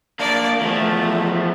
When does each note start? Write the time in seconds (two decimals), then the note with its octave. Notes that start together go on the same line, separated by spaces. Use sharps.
0.20 A#3 D4 D5
0.61 E2 F3 A3